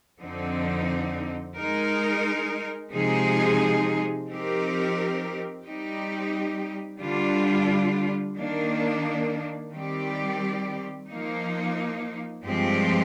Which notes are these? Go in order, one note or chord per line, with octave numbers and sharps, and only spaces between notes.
F2 D3 F3 C4 D#4
G#3 D#4 A#4
C3 F3 G#3 D#4 G#4
F3 C4 D#4 G4 A#4
G3 C4 D#4 G4
D3 G3 D4 F4
D#3 A#3 D4
D#3 G3 C4 G4 D5
F3 A#3 D#4
G2 F3 G#3 C4 G4